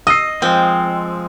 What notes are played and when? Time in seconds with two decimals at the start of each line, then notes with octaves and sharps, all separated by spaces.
0.07 D#5 D#6 E6 C7
0.42 F3 G#3 C4